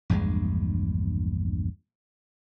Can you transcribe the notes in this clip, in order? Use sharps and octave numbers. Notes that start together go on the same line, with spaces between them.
A#1 E2 G2 G#3